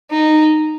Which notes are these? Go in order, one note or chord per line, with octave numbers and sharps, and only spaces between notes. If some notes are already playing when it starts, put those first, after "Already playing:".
D#4